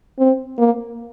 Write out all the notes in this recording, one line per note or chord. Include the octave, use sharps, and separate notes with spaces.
C4
A#3